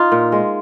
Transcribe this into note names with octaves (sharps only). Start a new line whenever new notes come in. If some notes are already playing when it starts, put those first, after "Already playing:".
Already playing: D#4 F4
A#2
G#3